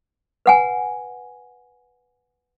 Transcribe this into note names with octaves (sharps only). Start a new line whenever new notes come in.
B4 F#5 G#5